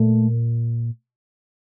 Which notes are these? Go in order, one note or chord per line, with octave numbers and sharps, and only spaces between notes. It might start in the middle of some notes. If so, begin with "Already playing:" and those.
Already playing: A#2 A3